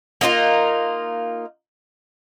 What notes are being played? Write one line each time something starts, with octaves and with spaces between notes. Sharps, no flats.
A#3 D#4 F4 A#4